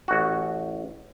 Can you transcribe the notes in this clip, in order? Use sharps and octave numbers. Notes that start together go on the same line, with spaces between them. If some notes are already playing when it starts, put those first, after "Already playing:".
A1 F#4